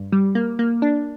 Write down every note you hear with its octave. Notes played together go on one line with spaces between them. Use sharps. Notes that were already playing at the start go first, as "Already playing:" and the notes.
Already playing: G2
G3
A#3
A#3
D4